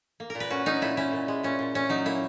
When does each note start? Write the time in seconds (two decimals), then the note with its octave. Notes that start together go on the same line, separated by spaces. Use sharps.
0.20 A#3
0.30 A#4
0.35 A#2
0.40 B4
0.50 C#4 F#4
0.66 C#4 D#4
0.81 A#2 E4
0.97 C#4 E4
1.13 A#2
1.28 G#3
1.43 A#2 C#4
1.59 A#2
1.74 A#2 C#4
1.89 F#3 D#4
2.05 A#3 E4